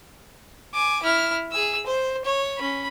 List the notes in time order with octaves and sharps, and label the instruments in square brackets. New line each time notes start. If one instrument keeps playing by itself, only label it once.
[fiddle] G#5 D6
E4 F6
G#4 E6
C5
C#5
C#4 B5